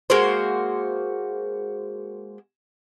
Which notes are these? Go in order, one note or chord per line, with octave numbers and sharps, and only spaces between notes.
G#3 A#3 F#4 C5